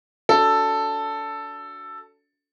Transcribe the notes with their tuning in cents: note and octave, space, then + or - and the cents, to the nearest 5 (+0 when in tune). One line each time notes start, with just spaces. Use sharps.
D4 -35 F#4 +0 A4 +5